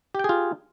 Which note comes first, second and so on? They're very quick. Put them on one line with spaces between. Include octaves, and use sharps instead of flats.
G4 G5 G#4 F4